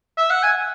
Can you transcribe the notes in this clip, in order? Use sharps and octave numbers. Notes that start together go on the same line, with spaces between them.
E5
F#5
G#5